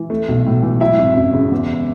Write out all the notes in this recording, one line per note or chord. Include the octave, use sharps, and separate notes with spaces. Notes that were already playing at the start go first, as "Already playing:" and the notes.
Already playing: E3
A3
B1
A2
E3
F#3 E4 E5
G#1
F#2
C#3
E2